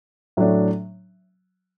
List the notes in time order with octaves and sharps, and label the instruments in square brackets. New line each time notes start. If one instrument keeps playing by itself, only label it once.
[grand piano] A2 F#3 A3 D4